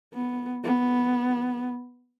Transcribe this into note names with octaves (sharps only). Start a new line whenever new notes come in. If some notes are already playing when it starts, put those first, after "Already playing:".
B3
B3